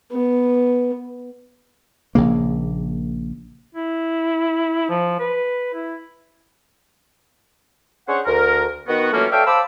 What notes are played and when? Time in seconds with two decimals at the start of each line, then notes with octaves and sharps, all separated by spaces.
0.12 B3
2.15 A#1 C#3 A#3
3.75 E4
4.89 F3
5.19 B4
5.74 E4
8.07 C#4 D4 G#4 C5 C#5 F#5
8.25 D2 A#4
8.88 D#3 B3 F#4
9.12 E3 F#3 A3 A#3 C#4 F4
9.31 A4 C#5 D5 E5 F5 G5
9.45 C5 F5 A5 B5 D6 E6